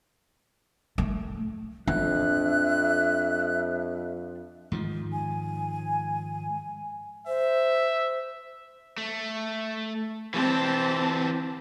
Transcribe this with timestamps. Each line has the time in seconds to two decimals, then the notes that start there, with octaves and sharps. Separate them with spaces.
0.98 A3
1.88 F2 D4 E5 F#6
4.72 G#2 D#3 F3
5.13 G#5
7.27 C5 E5
8.98 A3
10.34 E3 C4 G4 A5